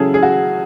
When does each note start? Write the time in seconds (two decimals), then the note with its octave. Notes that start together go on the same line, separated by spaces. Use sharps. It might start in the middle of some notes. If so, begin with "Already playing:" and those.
Already playing: C#3 F#3 C#4 E4 G#4 A4
0.14 G#4
0.23 F#4